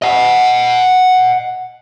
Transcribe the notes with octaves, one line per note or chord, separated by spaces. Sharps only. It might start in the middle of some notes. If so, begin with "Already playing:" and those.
D#5 F#5